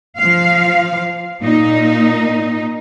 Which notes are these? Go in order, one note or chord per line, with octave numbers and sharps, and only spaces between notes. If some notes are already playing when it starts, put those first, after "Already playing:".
F3 F5
A#2 D#4